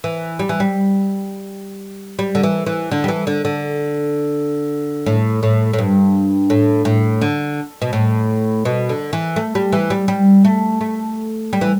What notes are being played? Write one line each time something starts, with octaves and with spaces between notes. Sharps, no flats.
E3
G3
E3
G3
G3
D3
E3
E3
D3
G3
E3
D3
D3
A2
A2
A2
G2
A2
A2
D3
B2
A2
B2
D3
E3
A3
G3
E3
G3
G3
A3
A3
G3
E3